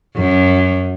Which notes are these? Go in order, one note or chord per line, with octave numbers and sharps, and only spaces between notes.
F#2